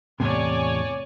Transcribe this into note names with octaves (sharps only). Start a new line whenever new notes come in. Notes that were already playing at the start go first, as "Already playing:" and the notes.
E2 A2 C3 C#5 D5 G#5